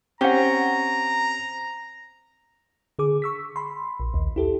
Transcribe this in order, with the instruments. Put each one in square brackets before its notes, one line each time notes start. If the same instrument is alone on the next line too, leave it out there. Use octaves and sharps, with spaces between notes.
[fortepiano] C4 C#4 [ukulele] G4 F#5 [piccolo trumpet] A#5
[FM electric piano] D3 G#4 D6
C#6 E6 B6
B5 C6
A#1
A#1 D#2
E4 G4 A4